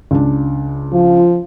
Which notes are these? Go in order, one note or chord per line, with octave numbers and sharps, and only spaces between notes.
C#2 D4
F3 F4